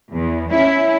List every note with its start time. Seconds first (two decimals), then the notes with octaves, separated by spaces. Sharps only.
0.13 E2
0.52 C#4 E4